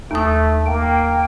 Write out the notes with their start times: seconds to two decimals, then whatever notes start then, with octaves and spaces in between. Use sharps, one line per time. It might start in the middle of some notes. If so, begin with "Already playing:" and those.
0.11 D#2 A3 D#6
0.66 A#3 G5